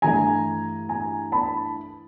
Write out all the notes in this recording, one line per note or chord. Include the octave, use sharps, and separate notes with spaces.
G2 E3 A3 G#5 A#5
G#5 A#5
A5 B5